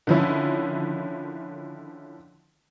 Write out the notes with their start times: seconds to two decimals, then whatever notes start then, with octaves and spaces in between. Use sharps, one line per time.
0.07 D3 D#3 F3 C#4 E4